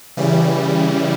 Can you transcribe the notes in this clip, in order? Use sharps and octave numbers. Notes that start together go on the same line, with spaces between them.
C#3 E3 G3